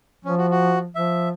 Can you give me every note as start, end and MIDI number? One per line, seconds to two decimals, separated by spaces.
0.25 0.88 53
0.25 0.35 61
0.38 0.46 66
0.51 0.79 66
0.95 1.32 53
0.95 1.29 76